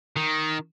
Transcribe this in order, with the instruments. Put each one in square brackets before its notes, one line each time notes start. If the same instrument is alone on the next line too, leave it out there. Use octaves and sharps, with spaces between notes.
[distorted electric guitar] D#3